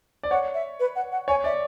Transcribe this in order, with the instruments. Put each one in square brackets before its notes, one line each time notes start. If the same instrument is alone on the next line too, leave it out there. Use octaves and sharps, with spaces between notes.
[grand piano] D5
[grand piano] C#5 [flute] F#5
[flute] E5
B4
F#5
F#5
[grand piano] C#5 [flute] G#5
[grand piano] D5 [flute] E5